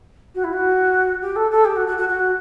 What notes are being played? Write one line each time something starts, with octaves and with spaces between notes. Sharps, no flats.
F#4
E4
F#4
G4
A4
A4
G4
F#4
F#4
F#4
F#4